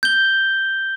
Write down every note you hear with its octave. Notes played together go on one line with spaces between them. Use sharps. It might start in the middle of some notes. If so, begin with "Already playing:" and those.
G6 G7